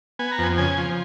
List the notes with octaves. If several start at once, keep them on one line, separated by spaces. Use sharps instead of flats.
B3 G#5
A#5
F2 G#5
C#3 G#5
F3